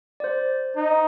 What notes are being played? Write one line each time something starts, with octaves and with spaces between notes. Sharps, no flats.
D5
C5
D#4